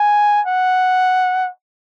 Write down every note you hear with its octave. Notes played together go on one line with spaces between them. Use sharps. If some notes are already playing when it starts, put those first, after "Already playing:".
Already playing: G#5
F#5